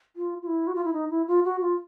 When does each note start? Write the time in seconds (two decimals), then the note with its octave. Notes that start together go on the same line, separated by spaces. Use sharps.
0.16 F4
0.42 F4
0.47 E4
0.67 F#4
0.75 F4
0.85 E4
0.93 D#4
1.10 E4
1.28 F4
1.45 F#4
1.61 F4